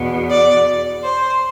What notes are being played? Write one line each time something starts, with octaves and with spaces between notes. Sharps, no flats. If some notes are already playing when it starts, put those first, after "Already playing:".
Already playing: E2 B2 B3
D5
C5